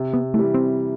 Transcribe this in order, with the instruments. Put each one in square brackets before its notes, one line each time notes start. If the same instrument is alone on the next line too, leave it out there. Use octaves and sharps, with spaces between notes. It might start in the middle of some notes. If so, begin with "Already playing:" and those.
Already playing: [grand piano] C3
[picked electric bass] B3
[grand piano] E3 G3 [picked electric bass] A3
[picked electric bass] C4